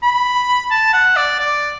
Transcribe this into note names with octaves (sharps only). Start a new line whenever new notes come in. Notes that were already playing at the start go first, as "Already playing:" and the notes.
B5
A5
F#5
D5
D5